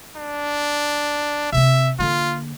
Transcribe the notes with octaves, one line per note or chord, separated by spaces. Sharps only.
D4
C3 C4 E5
D3 A#3 F4